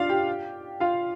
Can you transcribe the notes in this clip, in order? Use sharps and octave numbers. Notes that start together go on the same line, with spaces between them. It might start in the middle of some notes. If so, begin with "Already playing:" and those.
Already playing: D4 F4 D5 F5
G4 G5
F4 F5